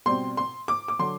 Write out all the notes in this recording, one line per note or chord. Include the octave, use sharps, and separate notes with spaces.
B2 G3 C4 C6
C6
D6
D6
D3 F#3 C6